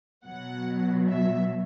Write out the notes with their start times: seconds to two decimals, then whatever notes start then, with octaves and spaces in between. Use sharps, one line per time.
0.25 B2 F#3 F#5
1.09 E5